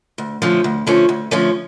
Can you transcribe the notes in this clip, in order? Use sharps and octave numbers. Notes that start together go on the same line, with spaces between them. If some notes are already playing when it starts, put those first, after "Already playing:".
D2
D3 F3 A3 C#4
D2
D3 F3 A3 C#4
D2
D3 F3 A3 C#4